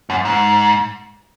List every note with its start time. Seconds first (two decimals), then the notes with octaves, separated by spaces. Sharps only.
0.10 F#2
0.25 G#2